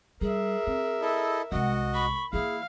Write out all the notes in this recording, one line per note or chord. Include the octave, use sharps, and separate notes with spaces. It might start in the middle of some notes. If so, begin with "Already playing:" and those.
G3 G#4 A#4 E5
C4
E4 A4 D#5
C2 G#3 F#4 D#5 F#5
B5 C#6
E3 A#3 E4 G#4 F5